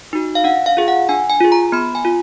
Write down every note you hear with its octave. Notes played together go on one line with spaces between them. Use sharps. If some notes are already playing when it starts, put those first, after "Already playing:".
D#4 F#4
F5
D4 F#5
F5
F4 G#4
F#5
D4 G#5
G#5
F4 G#4
A#5
B3 B5
G#5
F4